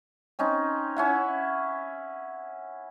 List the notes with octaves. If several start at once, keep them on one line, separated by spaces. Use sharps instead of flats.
C4 C#4 D#4
C#4 E4 F#5